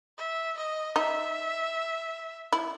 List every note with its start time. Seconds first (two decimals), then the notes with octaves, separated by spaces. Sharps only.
0.18 E5
0.57 D#5
0.96 D#4 E5
2.53 E4